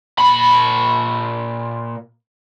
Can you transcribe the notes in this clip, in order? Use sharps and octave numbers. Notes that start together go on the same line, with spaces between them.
A#2 B5